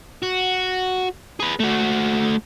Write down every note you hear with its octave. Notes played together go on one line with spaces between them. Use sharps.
F#4
G#4 B4
A3 F#4